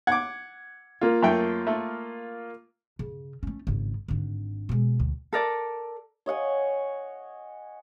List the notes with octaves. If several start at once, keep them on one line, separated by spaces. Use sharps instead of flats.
F#5 D6 G#6
A#3 F4
F#2 A3 G5
A3
C#3
A3 C#4
G#1 C#3
G#1 D3
B2 G#3
D2
A4 A#4 D5
C#5 D#5 F#5 G#5